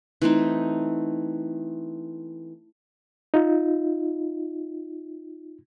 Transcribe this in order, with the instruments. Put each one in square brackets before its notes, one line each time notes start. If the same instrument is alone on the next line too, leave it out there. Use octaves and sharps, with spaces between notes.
[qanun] E3 A3 C4 D#4
[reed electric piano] D#4 F4